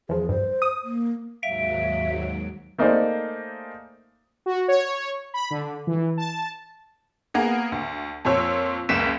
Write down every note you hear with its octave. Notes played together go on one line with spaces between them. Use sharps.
E2 F3 G#4
G2 C5
D#6
A#3
D#2 G#2 F#3 E5 F5 D7
A3 A#3 D#4 G#4 C5 D5
F#4
C#5
B5
D3
E3
A5
A#3 B3 G#4
D2
F2 A#2 C#5 E6
F#1 C#2 B6 E7